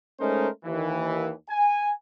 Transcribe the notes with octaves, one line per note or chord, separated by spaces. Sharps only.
G#3 A3 C#4 D#4 A#4 C5
D#2 E3
G#5